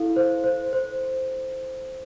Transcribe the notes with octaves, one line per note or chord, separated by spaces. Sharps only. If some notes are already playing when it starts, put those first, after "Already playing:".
Already playing: E4 A4 F5
C5
C5
C5